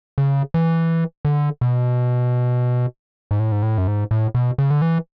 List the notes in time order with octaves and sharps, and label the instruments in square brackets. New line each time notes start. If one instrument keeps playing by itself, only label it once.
[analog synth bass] C#3
E3
D3
B2
G#2
A2
G#2
A2
F#2
G#2
A2
B2
C#3
D3
E3